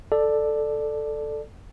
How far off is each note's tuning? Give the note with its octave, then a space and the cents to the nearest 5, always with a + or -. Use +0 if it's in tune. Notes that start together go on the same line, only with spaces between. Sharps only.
A4 +0 D5 +10